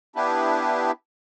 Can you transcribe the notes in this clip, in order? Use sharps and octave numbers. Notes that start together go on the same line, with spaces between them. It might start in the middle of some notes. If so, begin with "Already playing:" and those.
B3 D4 E4 G4 B4